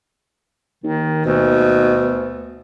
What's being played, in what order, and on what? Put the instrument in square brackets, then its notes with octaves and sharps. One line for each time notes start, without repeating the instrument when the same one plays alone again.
[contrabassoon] D#2 [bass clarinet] D#3
[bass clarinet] D2 [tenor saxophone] B2